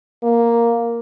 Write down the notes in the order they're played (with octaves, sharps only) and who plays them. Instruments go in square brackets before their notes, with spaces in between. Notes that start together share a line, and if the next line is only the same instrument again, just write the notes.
[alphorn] A#3